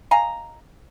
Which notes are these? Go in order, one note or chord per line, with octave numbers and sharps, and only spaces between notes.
D#5 F5 G#5 A#5